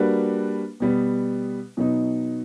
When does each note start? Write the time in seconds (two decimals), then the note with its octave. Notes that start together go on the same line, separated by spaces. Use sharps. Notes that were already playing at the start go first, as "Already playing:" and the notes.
Already playing: G3 A#3 D4 F#4 B4
0.80 B2 G3 B3
1.77 B2 F#3 B3 D#4